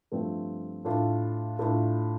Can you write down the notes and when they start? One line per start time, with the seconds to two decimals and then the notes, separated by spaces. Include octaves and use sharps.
0.12 G2 F3 A3 C4
0.85 A2 A3 D4 F4
1.59 A2 A3 D4 F4